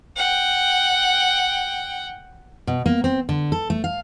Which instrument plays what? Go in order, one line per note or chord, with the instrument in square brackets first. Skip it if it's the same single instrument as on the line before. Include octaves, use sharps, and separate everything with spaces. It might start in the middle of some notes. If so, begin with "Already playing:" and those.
[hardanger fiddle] F#5 G5
[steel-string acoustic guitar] B2
A#3
C4
D3
A4
A3
F5